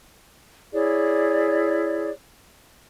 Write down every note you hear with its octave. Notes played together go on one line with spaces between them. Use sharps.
E4 G#4 C#5 D5